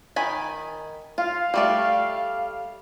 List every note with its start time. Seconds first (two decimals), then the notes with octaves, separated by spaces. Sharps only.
0.16 D#3 G#5 B5
1.18 F4 F5
1.54 G3 A3 D5